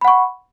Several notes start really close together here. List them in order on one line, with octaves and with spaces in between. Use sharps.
B5 F#5 C#6